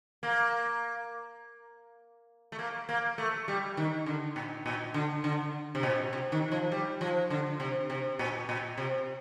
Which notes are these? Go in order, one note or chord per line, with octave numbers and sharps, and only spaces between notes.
A#3
A3
A#3
A#3
A3
G3
D#3
D3
A#2
A#2
D3
D3
C3
A#2
C3
D#3
F3
G3
F3
D3
C3
C3
A#2
A#2
C3